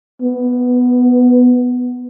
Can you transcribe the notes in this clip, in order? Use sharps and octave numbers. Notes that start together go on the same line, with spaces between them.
B3